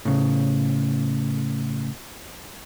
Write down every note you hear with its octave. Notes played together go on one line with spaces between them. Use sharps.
A2 C#3